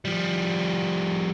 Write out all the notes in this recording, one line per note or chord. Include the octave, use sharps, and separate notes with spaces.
F3 G3